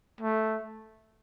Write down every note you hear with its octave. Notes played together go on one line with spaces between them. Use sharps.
A3